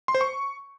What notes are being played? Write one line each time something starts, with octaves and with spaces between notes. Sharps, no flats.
C6
C5
C#6